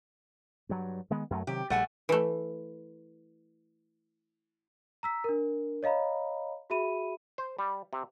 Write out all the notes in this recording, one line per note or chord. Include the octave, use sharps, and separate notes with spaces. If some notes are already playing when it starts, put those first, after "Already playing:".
G2 F#3
D#3 G#3 B3
F#2 F#3 A3
C3 D#3 F#3 G4
A#1 G3 A3 F#5 G#5
E3 A3
A#5 E6 B6
D4 A#4
C#5 D#5 F5 A#5 B5
F#4 G#4 E5 B5 D#7
C5
G3
C3